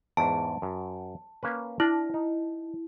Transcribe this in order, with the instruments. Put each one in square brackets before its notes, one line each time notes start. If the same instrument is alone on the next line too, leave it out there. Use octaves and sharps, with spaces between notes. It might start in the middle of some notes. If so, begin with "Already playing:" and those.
[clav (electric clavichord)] E2 G#2 [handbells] A5
[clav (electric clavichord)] F#2
A#3 C#4 B4
[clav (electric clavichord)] D4 [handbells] E4
[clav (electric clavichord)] D#4